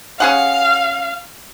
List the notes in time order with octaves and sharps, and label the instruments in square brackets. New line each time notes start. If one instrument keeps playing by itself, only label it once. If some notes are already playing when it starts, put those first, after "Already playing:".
[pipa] C#4 G#4 F#5 [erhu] F5